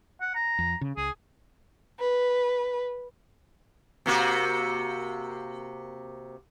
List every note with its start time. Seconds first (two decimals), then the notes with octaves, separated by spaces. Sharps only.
0.21 F#5
0.35 A#5
0.59 F2
0.81 C#3
0.97 C#2 G#4
2.00 B4
4.06 C3 A#3 F#4